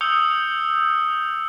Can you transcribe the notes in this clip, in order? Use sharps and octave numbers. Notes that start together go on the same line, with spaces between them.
D#6 E6 G6 C#7 F7 G7